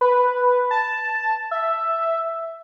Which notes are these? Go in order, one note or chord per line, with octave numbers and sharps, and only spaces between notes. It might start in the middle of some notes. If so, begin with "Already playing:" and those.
B4
A5
E5